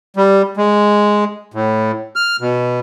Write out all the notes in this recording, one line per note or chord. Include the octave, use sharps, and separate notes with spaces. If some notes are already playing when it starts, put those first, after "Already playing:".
G3
G#3
A2
F6
B2